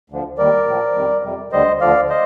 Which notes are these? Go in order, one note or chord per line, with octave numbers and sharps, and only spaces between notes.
D2 D3 F3
D#2 D#3 G3 A#4 D5
A2 F3
F2 D#3 G3
F2 C3 G3
D2 D3 G3 C5 D#5
D2 D3 F3 D5 F5
C5 D#5